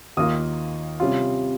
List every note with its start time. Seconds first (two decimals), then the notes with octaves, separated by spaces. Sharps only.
0.17 D#2 D#3 A#3 F4 D#6
1.00 C3 G3 C#4 F4